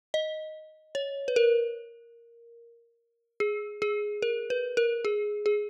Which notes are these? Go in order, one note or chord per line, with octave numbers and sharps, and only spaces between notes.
D#5
C#5
B4
A#4
G#4
G#4
A#4
B4
A#4
G#4
G#4